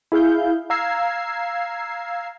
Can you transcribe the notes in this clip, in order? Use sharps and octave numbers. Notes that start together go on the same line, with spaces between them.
E4 G#4 F5 G6
F5 A#5 E6 G#6 C7